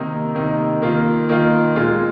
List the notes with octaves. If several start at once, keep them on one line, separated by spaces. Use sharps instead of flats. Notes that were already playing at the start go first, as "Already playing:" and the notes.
Already playing: C3 D#3 A#3 D#4
C3 D#3 A#3 D#4
D#3 A#3 F4
D#3 A#3 F4
A#2 G#3 F4